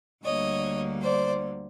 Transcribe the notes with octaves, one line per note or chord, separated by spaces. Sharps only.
D2 D3 G3 A#3 C#5 D#5
C5 D5